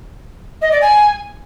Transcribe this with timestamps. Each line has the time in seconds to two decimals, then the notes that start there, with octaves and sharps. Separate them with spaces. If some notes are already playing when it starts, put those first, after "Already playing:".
0.61 D#5
0.71 D5
0.81 G#5